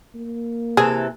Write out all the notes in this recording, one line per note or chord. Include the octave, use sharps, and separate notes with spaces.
A#3
C3 E3 G#4 A4